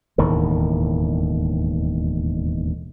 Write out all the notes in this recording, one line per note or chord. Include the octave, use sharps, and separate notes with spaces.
E1 D#2 A2 D#3